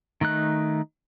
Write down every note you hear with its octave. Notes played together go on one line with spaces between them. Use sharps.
D#3 A3 D#4 F#6